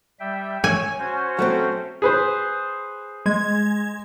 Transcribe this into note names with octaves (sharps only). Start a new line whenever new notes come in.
G3 E5 G5
C#5 G#5 E6
C#4 F#4 C5
F#3 A3 C4
G#4 B4 C5
G#3 G#6